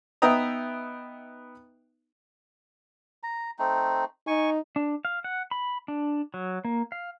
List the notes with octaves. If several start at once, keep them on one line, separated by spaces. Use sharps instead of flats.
B3 D#4 E5 G5 A#5 D#6
A#5
A3 C4 D#4
D#4 G#5 C#6
D4
F5
F#5
B5
D4
F#3
A#3
F5